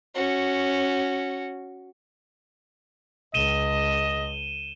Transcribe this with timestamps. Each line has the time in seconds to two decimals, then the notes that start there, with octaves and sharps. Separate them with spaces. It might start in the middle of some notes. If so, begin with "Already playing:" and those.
0.15 C#4 F#4
3.34 C#2 D#5 D#7 E7 G7